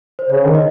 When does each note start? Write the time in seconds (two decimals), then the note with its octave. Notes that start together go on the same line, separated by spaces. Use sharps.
0.19 C5
0.30 C#3 C#5
0.46 D#3
0.55 D#5